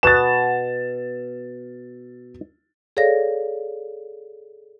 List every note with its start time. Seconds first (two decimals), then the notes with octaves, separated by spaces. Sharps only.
0.03 B2 B3 F#5 A6 E7
2.97 G#4 A4 C#5 D5 F5 A#6